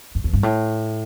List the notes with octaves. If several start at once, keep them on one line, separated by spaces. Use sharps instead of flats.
F#2
E2
G2
A2